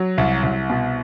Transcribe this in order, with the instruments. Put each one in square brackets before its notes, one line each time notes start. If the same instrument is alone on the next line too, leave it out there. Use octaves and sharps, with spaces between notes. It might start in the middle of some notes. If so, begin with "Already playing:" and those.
Already playing: [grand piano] F#3
C2
C2
B2